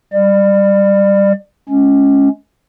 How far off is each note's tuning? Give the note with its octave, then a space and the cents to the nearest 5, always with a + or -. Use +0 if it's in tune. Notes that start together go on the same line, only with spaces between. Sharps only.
G3 +0 D5 +30
G#3 +25 C#4 +0